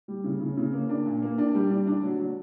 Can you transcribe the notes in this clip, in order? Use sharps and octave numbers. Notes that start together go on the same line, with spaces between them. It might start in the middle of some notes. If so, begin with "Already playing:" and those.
G3
C#3
C#3
C#3
A#3
D4
A#2
A#3
D4
G3
D4
D4
F#3
F#3